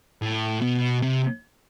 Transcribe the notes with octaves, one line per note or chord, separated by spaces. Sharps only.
A2
B2
C3